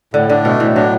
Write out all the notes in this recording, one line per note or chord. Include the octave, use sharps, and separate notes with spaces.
A2 D3
D3 D4
B2 A3
A2 E3
F#3 D4